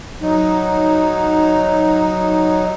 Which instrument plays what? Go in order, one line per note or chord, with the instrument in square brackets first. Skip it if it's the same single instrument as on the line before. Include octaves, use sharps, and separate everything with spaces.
[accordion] F#3 D#4